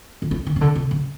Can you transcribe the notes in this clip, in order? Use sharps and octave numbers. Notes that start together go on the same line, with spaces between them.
D#3
E3
D#3
C#3
D3
C3
C#3